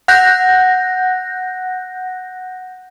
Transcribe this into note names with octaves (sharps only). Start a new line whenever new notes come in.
F#5 F#6 G6 A#6